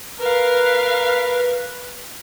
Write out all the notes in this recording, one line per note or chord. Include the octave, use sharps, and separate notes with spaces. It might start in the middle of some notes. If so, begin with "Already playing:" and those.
A#4 B4 F5